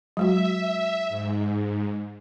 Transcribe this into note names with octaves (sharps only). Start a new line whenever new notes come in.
F#3 G#3 F#4 E5
G#2